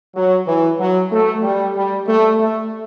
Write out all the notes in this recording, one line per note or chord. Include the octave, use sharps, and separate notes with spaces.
F#3
E3
F#3
A3
G3
G3
A3
A3